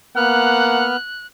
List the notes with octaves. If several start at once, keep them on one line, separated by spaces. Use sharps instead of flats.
A#3 B3 F#5 F6 F#6